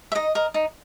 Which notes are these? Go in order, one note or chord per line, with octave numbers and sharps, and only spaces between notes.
E5
D#4 D#5
A#4 D#5
D#4